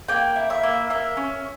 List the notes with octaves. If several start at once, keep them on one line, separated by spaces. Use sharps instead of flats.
A#3 G5
E4
E5
A#3
A#3 E5
C#4